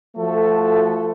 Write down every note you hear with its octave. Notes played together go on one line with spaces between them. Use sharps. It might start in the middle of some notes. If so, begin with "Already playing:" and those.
F3 A3 F#4 A4